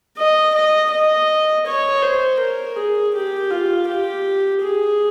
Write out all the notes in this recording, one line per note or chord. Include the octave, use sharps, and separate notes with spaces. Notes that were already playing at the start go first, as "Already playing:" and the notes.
D#5
D#5
D#5
C#5
C5
A#4
G#4
G4
F4
G4
G#4